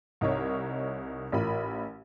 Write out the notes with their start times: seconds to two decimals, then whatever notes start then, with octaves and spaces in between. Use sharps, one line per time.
0.21 C2 D#4 A#4 C#5
1.32 A1 F4 A#4 B5